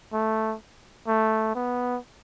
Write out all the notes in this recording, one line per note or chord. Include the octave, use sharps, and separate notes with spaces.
A3
A3
B3